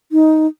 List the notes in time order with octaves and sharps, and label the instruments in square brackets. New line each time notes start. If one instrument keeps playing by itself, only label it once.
[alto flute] D#4